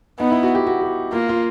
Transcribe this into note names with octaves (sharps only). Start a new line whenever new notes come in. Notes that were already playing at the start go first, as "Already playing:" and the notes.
B3 D#4
E4
F#4
G4
F#4
G4
A#3 F4
F4